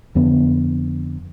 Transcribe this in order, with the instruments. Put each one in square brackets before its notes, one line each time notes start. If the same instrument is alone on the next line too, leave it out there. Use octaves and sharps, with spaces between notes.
[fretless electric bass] F2 D3 B3